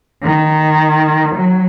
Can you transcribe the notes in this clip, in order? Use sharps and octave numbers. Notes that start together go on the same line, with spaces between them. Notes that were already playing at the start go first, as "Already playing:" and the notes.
D#3
F#3